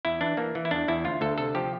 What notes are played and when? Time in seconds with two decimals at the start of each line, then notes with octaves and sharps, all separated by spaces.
0.05 E2 E4
0.21 E3 D4
0.37 E3 A#3
0.55 E3
0.65 E4
0.71 E2 D4
0.88 E2 E4
1.04 D2 F4
1.21 D2 A4
1.38 C3 A4
1.55 F3 G4